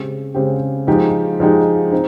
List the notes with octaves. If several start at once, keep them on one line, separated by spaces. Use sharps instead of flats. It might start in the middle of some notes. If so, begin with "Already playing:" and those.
Already playing: C#3 G#3 C4 G4
C#3 G#3 C4 G4
F3 G#3 D#4 G4
F3 G#3 D#4 G4
C4 D#4